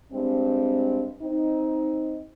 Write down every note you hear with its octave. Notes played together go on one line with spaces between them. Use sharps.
G2 G#3 C4
C4 D#4